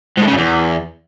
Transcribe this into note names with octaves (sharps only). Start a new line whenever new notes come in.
G#2
A2
C#3
F#2
E2